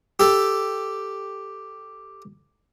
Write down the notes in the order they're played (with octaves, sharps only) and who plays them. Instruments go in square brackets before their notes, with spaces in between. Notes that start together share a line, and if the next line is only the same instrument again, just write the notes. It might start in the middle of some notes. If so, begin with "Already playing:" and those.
[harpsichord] G4 A4